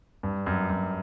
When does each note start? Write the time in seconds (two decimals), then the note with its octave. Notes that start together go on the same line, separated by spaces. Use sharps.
0.23 G2
0.46 F#2
0.70 F#2